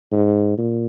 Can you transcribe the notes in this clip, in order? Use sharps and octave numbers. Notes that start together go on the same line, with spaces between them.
G#2
A#2